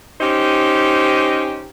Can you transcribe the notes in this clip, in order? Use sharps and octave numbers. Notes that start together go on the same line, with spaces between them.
C#4 D#4 G4 C5